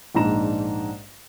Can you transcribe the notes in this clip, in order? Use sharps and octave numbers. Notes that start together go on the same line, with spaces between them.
A#1 G#2 D4 A#5 E7